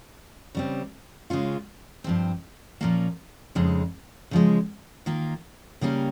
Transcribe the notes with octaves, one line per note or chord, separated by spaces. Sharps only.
C#3 G3 C4
C#3 G#3 C#4 F4
G2 F3 C4
A#2 F3 A#3 C#4
F2 C#3 G#3 D#4
C#3 F3 G#3
D#3 A#3 F4
C#3 G3 A#3 C#4 G4